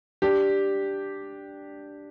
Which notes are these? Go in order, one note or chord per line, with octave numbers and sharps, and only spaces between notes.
D4 G4